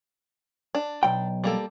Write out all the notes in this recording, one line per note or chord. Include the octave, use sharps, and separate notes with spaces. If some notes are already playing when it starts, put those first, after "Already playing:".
D4
B1 G5
G3 A#3 A4